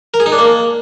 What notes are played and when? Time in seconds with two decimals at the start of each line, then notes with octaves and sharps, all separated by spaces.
0.14 A#4
0.20 G#4
0.26 D#4
0.32 D4
0.38 A#3